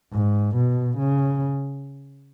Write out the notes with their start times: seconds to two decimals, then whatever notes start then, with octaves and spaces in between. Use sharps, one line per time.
0.12 G#2
0.55 B2
0.98 C#3